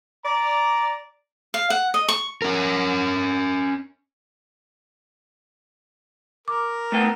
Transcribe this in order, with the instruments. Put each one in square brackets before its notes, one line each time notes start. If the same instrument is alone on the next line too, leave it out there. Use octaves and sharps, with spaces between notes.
[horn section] D5 A#5
[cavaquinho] F5
F#5
D#5
C#6
[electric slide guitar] C#4 A#4
[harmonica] A#4 [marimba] D6
[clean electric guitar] A3 B3 G5